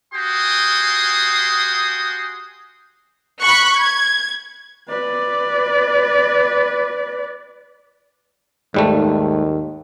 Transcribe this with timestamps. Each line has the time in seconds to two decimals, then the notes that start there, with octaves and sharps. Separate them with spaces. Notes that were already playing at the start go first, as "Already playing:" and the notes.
0.14 F#4 G4 G#5 C6 D#6
3.43 B5 C#6 F#6
3.80 G#6
4.89 B4 D5
8.74 D#2 G#2 G3 A3